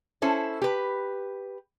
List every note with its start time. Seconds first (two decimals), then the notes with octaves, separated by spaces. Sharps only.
0.22 C#4 E4 A4 C5
0.62 G4 B4